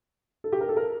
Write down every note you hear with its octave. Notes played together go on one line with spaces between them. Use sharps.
A4
G4
A#4
A4
A#4